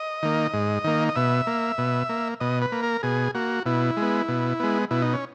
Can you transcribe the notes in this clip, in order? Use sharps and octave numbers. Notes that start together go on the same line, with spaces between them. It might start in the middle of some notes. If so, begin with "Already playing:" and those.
Already playing: D#5
D#3 A#3
G#2
D#3 A#3
D#5
B2 E5
A#3
B2
A#3
B2 D#5
B4
A#3
A#4
B2 G#4
A#3 F#4
B2 E4
G#3
B3
B2
G#3 B3
B2 E4
D#4
C#4